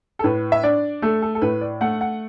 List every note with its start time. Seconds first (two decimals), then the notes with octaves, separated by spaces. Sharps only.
0.19 A4
0.24 A2 B4
0.52 E5
0.63 D4 D5
1.02 A3 A4
1.22 A4
1.35 A4
1.41 A2 B4
1.61 D5
1.81 A3 F#5
2.01 F#5